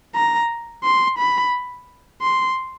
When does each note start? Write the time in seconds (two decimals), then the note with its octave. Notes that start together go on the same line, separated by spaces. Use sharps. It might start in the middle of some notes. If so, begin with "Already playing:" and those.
0.15 A#5
0.84 C6
1.18 B5
2.22 C6